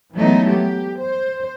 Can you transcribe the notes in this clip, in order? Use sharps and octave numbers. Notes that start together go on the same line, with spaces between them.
E3 F#3 G#3 A3 B3 D#4
G4
C5